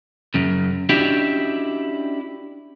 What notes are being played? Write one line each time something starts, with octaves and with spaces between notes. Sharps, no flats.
F#2 C#3
C#4 D4 E4 F#4 G4 D#5